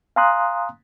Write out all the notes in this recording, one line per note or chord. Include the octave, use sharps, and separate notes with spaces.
F5 G#5 A#5 C6 D#6 F#6